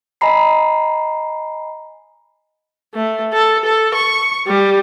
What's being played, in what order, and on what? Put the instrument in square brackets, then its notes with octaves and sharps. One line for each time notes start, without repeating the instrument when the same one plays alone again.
[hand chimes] D#5 G#5 A#5 B5 C7
[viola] A3
A4
A4
C#6
G3